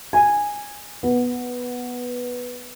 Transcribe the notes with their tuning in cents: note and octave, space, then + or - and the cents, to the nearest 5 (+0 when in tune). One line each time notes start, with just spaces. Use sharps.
G#5 -10
B3 -5